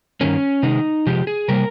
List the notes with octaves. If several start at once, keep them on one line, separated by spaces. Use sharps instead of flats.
G2 D#3 A#3 C#4
C3 D#3 G#3 D#4
C3 F3 G#3 G4
G#4
C3 G3 A#3 A#4